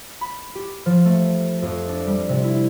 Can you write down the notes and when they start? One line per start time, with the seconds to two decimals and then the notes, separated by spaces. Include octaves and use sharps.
0.21 B5
0.55 G4
0.86 F3
1.05 A3
1.62 F2
1.88 D4
2.07 G3
2.29 C3
2.44 E4